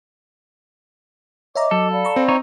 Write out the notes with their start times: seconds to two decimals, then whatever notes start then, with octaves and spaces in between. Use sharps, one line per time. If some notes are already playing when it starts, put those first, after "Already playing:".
1.55 C#5 D#5 E5 A#5 D6
1.71 F#3 A4
1.90 D5 F5 B5
2.05 A#5 C#6
2.16 C4
2.28 D#4 C#5